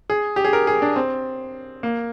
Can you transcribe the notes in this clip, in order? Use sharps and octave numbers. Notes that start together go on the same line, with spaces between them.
G#4
G4
G#4
A#4
G#4
D4
C4
A#3